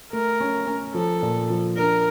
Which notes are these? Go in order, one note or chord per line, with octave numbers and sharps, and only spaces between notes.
A3 A#4
C#4
C#4
F3 A4
A#2
F3
D4 A#4